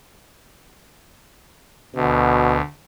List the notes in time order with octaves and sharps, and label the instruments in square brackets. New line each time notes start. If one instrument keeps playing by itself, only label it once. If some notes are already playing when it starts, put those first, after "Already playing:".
[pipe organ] D2 [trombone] B2